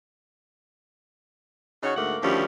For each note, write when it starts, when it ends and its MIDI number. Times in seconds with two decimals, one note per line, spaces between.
1.83 1.94 49
1.83 1.94 63
1.83 1.94 66
1.83 1.94 73
1.96 2.16 38
1.96 2.16 44
1.96 2.16 57
1.96 2.16 58
1.96 2.16 78
2.22 2.45 38
2.22 2.45 51
2.22 2.45 53
2.22 2.45 55
2.22 2.45 61